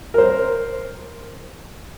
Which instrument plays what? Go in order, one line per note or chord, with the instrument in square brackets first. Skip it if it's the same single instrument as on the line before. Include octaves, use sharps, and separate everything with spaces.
[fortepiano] A#4 C5